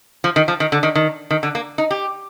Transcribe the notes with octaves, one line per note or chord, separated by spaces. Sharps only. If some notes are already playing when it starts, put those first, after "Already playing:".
F3
D#3
F3
D#3
D3
D#3
D#3
D#3
D3
A#3
D#4
G4